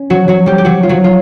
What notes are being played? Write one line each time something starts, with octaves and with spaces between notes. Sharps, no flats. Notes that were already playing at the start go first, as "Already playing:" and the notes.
Already playing: C#4
F#3 F#4
F#3 F#4
G3 G4
G4
F#3 F#4
F4
F#3 F#4
F4